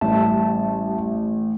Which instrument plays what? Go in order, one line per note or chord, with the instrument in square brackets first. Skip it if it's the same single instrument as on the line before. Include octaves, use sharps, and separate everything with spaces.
[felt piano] A1 [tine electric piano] G3 E5 A5